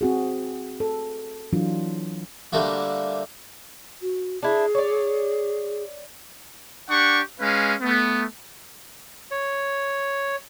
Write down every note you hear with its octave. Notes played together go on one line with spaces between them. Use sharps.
C4 F#4 G#4
A4
E3 F#3 D4 F4
D3 G3 A3 A#3 F#4
F#4
D4 E4 G#4
C#5 D5
D4 G4 F#5 C#6
G#3 C#4 B4 F5
A3 B3
C#5